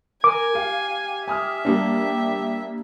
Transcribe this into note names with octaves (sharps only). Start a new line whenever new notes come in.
A#4 G#5 D6
G4 F5
E5 G#5 D#6 F6
G3 A#3 D4